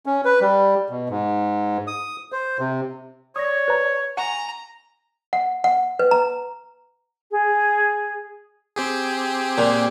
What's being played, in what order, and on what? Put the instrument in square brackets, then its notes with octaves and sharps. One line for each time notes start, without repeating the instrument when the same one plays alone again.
[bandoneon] C#4
B4
G3
B2
G#2
D#6
C5
C3
[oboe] C#5 [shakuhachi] D5 [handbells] D#6 A#6
[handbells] B4 C5 A#5
[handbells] F#5 C#6 [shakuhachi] G#5 [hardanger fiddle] A#5
[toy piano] F#5
F#5
B4
A#5
[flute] G#4
[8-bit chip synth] C4 G4 G#4
[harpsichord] A#2